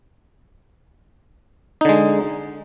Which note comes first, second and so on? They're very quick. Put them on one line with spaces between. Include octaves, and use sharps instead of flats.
D#4 D3 G#3